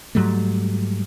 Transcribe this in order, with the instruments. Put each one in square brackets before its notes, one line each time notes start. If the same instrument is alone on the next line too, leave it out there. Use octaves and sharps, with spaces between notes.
[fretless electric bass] G#2 F#3 G3 A3